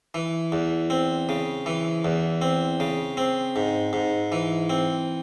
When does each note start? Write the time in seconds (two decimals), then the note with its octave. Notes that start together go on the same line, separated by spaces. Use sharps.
0.14 E3
0.52 E2
0.90 C4
1.29 C#3
1.66 E3
2.05 E2
2.42 C4
2.80 C#3
3.17 C4
3.56 G#2
3.93 G#2
4.32 E3
4.70 C4